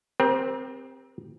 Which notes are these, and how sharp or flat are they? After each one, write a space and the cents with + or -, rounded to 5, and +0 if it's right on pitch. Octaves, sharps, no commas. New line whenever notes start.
C4 +0 G4 +35 A#4 +40